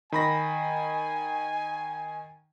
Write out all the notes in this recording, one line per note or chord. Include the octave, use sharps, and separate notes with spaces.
D#3 G#5 B5 A#6